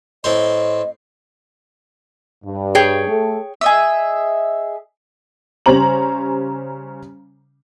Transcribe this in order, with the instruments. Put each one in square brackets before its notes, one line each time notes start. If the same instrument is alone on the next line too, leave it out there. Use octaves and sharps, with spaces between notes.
[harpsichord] A2 C4 C5 [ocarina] D#5
[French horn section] G2
[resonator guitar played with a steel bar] G#4 C#5 G5
[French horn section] A3 A4
[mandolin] G#4 D#5 E5
[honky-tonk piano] C#3 G3 C#4 C5 A#5 F#7